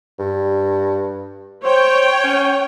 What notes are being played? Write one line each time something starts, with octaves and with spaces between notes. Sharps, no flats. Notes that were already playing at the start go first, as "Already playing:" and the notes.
G2
C5 C#5 G5
C#4